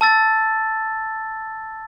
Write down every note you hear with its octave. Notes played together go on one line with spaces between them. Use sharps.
A5 E6 A6